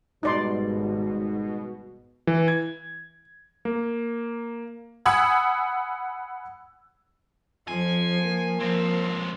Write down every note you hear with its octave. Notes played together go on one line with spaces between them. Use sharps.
G#1 G#2 B2 G3 D#4 D5 C6
E3
G#6
A#3
F#5 G#5 B5 D#6 E6 G#6
F2 F3 G#5
A#3
C#2 F3 C4